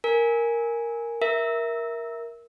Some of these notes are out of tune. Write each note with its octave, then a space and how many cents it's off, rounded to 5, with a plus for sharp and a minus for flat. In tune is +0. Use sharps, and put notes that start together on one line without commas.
A#4 +0 G#5 +0
A#4 +10 E5 +0